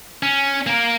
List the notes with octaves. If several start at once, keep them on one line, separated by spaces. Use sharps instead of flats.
C#4
A#3 A#4